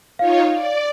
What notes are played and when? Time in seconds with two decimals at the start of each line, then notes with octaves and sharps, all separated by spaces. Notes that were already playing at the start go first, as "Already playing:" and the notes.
0.19 D#4 F4 C#5 F5
0.52 D5